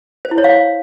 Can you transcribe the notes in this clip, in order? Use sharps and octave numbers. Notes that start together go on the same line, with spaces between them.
C5
E4
C#5
F5